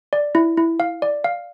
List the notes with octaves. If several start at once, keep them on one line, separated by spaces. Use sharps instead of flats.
D5
E4
E4
F5
D5
F5